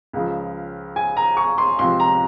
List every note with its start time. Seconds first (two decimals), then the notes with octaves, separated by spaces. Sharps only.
0.13 C#2 C#3 F3
0.96 G#5
1.17 A#5
1.37 C#6
1.58 C6
1.79 C#2 C3 F3 C6
2.00 A#5